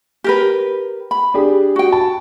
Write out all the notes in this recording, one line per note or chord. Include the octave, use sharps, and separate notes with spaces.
G4 A#4 B4
B5
D4 G4 G#4
F#4 G5
A5